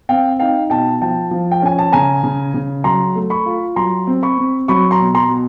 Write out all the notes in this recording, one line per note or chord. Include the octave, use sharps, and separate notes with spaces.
C4 F5 G5
D#4 F5 G5
B2 G5 A5
F3 G5 A5
F3
G5
C#4 G#5
A5
C#3 G#5 A#5
C#3
C#3
F#3 A#5 C6
A3
B5 C#6
F4
F#3 A#5 C6
C4
B5 C#6
C4
F#3 B5 C#6
A#5 C6
B2
A#5 C6
B2